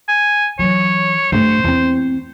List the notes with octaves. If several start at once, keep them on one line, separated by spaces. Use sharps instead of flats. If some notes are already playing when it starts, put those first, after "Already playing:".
G#5
E3 F#3 C#5
G2 A3 C5
E2 C4